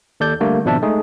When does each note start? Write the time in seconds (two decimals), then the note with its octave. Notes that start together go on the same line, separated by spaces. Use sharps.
0.20 D#2 A4 D5 G6
0.40 D3 G3 A3 A#3
0.65 G#1 B2 F3 D4 E5 A5
0.83 G#3 A3 D#4 G#4